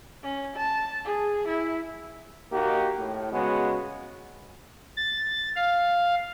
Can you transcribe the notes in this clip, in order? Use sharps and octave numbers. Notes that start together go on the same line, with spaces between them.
C#4
A5
G#4
E4
A#3 D#4 F#4 G4
A2
C#3 G#3 B3 F#4
A6
F5